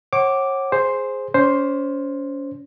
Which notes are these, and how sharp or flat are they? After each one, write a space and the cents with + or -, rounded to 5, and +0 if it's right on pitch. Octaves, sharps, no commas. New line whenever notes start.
C#5 -35 F#5 +20 D6 +0
G#4 +0 C5 +0
C#4 +30 C5 +0